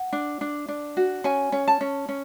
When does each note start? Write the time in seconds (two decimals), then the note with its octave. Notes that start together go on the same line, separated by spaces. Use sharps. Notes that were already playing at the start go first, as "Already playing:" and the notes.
Already playing: F#5
0.13 D4
0.41 D4
0.68 D4
0.97 F#4
1.24 C#4 G#5
1.52 C#4
1.68 A5
1.81 C#4
2.09 C#4